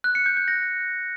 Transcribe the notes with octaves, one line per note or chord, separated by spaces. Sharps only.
F#6
C#7
G6
G6
A#6